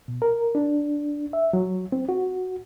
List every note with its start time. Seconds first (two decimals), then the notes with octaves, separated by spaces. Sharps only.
0.08 B2
0.22 A#4
0.55 D4
1.33 E5
1.53 F#3
1.92 C4
2.09 F#4